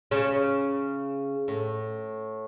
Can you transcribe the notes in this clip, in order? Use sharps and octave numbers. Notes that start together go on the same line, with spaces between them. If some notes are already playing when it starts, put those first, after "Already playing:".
C#3
A2